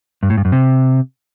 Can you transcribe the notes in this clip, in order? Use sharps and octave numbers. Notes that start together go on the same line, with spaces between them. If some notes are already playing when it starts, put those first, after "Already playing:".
G2
A2
G2
F#2
C3